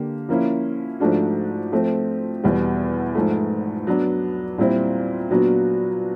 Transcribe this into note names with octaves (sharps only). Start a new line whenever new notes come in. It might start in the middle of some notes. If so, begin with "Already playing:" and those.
Already playing: D3 A#3 G4
F3 A#3 C#4 E4
G#2 F3 A3 D4 F#4
F3 A3 C4
E2 B2 G3
G#2 F3 A3
F#3 B3 D4
A#2 G3 C4 E4
A#2 F#3 B3 D4 F#4